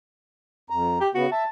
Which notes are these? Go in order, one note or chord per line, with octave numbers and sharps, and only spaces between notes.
F2 A#5
G4
C#3 B3 F#4
E5 A5